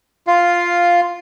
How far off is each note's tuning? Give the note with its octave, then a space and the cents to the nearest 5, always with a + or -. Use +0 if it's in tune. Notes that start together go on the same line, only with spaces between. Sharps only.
F4 +0 F5 +0